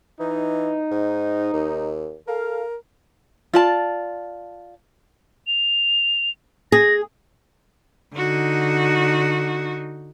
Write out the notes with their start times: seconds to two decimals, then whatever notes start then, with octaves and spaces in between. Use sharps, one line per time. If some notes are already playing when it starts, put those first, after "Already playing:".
0.20 E3 D#4
0.91 G#2
1.53 D#2
2.27 A4 A#4 F5
3.54 F4 D5 A5
5.47 F7
6.72 G#4 A#6
8.16 D3 D#4 F#4